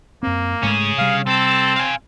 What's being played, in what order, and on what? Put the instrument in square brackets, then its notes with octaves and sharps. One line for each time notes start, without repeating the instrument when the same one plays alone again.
[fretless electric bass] F#2 C4 [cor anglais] A#3
[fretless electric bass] G#2 G#3 A3 [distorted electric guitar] C#4 G#4
[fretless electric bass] C3 G3 [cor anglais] F5
[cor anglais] C4 [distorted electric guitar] A4
[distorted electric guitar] F5 G#5